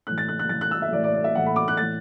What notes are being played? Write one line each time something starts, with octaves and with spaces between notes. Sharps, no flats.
A2 E3 F#6
A6
F#6
F#6
A2 E3 A6
F#6
E6
E5
A2 E3 D5
D5
D5
E5
A2 E3 F#5
B5
D6
F#6
A2 E3 A6